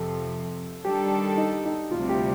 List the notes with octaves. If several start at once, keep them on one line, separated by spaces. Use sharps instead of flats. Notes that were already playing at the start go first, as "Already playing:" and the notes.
Already playing: F2 C3 F3 A4
D#3 G3 D4 G4 A4
D#4
D#4
D2 C3 G3 F4
G4